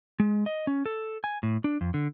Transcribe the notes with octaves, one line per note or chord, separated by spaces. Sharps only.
G#3
D#5
C#4
A4
G#5
A2
D4
F2
D3